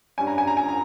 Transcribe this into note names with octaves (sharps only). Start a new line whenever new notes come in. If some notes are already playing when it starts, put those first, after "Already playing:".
G2 G3 C#4 G#5
A#5
G#5
A#5
G#5
A#5